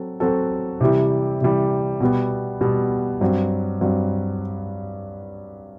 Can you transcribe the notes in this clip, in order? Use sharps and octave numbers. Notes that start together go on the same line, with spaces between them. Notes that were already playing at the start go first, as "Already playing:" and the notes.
Already playing: F#3 C4 A4
F#3 C4 F#4 A4
C3 E3 G3
C3 E3 G3
B2 G3 B3
B2 G3 B3
G2 F#3 C4
G2 F#3 C4